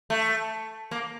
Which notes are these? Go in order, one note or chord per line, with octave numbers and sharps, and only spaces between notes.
A3
A#3